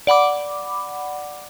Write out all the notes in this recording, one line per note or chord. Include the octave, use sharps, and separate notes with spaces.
D5 F#5 B5 D6